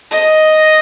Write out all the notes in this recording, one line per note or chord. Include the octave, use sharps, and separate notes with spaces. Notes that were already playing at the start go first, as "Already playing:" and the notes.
D#5